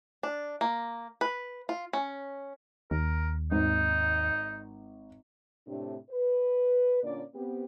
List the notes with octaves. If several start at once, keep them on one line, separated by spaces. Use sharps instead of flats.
D4
A#3
B4
F4
C#4
D#2 A#4
G#1 D#4
A2 C3 D4
B4
A#2 D3 A#3 C#4 D5
B3 C4 G4